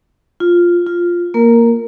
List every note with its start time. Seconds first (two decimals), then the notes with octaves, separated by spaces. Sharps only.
0.40 F4
0.87 F4
1.34 A#3 A#4